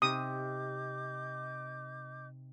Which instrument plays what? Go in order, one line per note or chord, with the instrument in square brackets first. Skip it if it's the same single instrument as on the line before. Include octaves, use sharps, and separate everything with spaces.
[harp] C3 D#4 [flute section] D#5 D6 G6 [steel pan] D#6